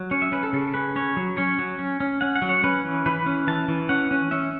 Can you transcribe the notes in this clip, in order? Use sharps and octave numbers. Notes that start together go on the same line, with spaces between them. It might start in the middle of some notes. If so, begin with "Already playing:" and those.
Already playing: F#3
C#4 C#5
E5
C#4 B4
A4
C#3 A4
C#4 B4
C#4 C#5
F#3
C#4 C#5
F#3
C#4
C#4
C#4 F#5
F#5
F#3
C#5
C#4 B4
E3
E3 B4
C#4
E3 A5
E3
C#4 F#5
C#4
C#4 E5